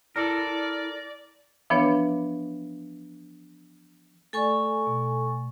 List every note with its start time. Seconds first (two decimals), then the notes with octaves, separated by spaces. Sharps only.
0.16 E4 A4 A#4 D5
1.70 E3 F3 B3 D4 B4 C#5
4.33 A3 A4 D5 G#5 C#6
4.87 B2